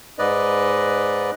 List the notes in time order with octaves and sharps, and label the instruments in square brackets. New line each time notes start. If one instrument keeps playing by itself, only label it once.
[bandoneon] G#2 B4 D5 D#5